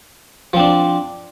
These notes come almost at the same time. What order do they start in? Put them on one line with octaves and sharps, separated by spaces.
F3 C4 D4